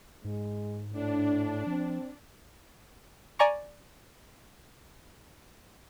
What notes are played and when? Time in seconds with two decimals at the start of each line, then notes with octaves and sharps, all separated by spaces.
0.25 G#2 G#3
0.92 A2 D4
1.67 F3 C4
3.39 D5 G#5 A#5 C#6